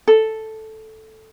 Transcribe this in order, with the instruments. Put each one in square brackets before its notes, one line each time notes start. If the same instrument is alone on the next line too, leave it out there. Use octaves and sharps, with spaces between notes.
[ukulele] A4